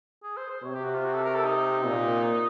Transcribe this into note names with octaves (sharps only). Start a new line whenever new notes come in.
G#4
C5
C5
C3 C#5
G4
F#4
F4
F#4
A4
A#4
A4
D#4
A#2